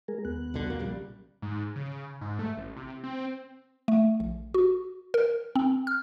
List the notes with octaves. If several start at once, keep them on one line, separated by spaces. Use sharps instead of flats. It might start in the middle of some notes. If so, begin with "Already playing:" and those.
G#3 G#4 A#4
D#2 B3 F#6
C2 B2 D3
F#3 A#3
A#1 C#3 G3
G#2
C#3
G#2
A3
A1
C3
C4
A3
A#1
F#4
A#4
C4
F6